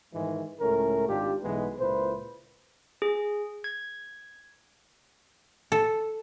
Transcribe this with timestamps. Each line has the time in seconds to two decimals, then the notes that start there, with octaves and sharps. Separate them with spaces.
0.14 G#2 D#3 E3 G#3
0.60 C#2 A2 A3 C#4 A#4
1.08 G#1 G#2 D4 F4 G4
1.43 B1 B2 E3 G#3 B3 B4
1.79 C#2 A#2 E4 B4 C5
3.02 G#4
3.64 G#6
5.72 A4